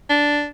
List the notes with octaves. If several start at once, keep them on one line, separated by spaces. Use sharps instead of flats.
D4